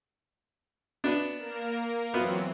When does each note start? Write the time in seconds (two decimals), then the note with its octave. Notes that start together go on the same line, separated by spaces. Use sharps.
1.04 B3 D4
1.38 A#3 A#4
2.14 E3 F#3 B3 C4 F4